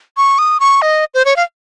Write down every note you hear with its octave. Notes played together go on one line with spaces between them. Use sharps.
C#6
D#6
C#6
D#5
C5
C#5
F5